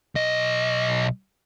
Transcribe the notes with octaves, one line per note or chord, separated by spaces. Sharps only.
B1 D#5